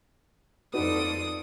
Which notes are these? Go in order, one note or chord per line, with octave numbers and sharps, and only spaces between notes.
F2 D#4 F#4 A4 B4 D5 D#6